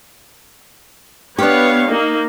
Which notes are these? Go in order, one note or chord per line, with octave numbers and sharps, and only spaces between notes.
B3 D4 G4 C#5 F5
A#3 D#4